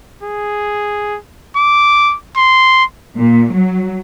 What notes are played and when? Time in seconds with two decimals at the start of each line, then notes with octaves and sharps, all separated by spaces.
0.23 G#4
1.57 D6
2.37 C6
3.17 A#2
3.53 F#3